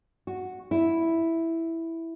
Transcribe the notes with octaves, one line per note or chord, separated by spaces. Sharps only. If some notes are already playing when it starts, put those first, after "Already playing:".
F#4
E4